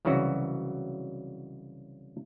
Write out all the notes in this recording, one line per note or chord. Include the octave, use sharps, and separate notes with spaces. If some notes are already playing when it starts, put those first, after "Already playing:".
C2 C#3 E3 F#3 F#4